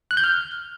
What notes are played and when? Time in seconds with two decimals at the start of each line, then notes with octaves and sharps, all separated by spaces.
0.11 F#6
0.17 G6
0.24 F6